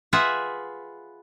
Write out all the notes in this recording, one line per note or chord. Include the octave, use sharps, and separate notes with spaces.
F4 G#4 B4 E5 F#5